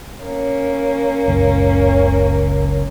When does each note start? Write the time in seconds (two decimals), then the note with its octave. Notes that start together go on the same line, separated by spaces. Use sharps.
0.24 A#3 C#4
1.28 F#1 C#2 F#2